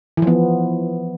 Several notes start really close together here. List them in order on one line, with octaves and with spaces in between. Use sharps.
E3 F3 B3